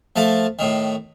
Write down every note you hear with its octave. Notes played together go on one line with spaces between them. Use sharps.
F3 A3 A5
A2 D#3